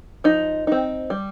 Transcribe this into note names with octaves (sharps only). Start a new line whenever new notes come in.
F3 D#4
C4 D#4
G3